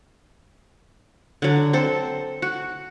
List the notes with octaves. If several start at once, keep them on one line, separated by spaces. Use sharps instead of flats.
D3 F#3
C4 A4
F#4